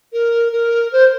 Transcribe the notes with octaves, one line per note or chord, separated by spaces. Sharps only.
A#4
A#4
C5